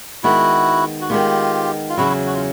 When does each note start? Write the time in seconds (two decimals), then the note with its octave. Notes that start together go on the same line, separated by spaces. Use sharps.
0.24 D#3 G#3 B3 E4 F#4
1.01 F#4
1.10 D#3 G#3 B3 F4 G4
1.90 F4
1.97 E2 C#3 F#3 E4 F#4
2.27 F#4
2.34 F4